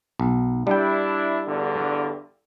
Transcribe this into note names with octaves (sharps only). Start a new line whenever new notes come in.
B1
G3 D4 E4 G5
E2 G2 D3